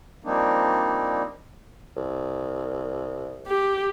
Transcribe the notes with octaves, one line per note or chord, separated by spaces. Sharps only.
F3 G3 A#3 C4 D4 D#4
C2
G4